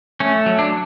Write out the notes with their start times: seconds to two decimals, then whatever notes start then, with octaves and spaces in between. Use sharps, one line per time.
0.20 A3 C#4
0.46 F#3
0.59 D4